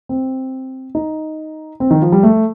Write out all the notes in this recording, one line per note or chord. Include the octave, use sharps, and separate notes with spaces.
C4
D#4
C4
D#3
F3
G3
A3